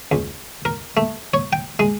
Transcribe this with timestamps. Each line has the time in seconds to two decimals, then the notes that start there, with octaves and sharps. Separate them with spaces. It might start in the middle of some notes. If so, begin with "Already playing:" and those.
0.12 C#2
0.65 A#4
0.97 A3
1.34 C#5
1.53 G5
1.79 G#3